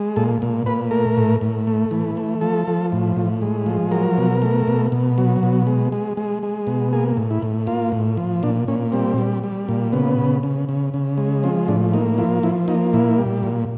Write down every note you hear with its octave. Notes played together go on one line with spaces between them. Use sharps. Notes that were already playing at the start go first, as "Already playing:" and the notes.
Already playing: G#3
A#2 A4
A#2
A#2 B4
A3 A#4
A2
A2
A3
E3
A3
F3 A4
F3
A2
A2
G#3
F3
F#3 A#4
B2
A3
B2
B2
F#3
B2
G#3
G#3
G#3
G#3
B2
A#3 G#4
A2
E4
A2
A#3 F4
A2
F3
A#2 D4
A#2 C#4
G3 C4
G3
G3
A#2
C#3 B3
C#3
C#3
C#3
C#3
G#3
F3 C4
A2 D4
A#3 D#4
F3 E4
F3 E4
A#3 D#4
A#2 E4
G3
A#2